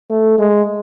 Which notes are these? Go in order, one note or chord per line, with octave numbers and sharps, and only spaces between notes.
A3
G#3